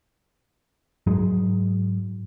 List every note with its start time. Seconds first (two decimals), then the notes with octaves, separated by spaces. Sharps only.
1.07 G#2 F#3 G#3